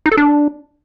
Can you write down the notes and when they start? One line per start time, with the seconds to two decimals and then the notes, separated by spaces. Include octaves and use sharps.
0.06 D#4
0.12 A4
0.17 D4